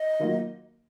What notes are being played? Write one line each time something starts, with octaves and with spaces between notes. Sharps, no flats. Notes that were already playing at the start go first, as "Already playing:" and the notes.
Already playing: D#5
D#3 F#3 A#3 F4